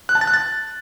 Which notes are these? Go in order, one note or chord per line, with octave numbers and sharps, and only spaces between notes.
F#6
A5
A6
F#6
A6